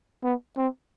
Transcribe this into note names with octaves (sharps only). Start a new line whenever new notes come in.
B3
C4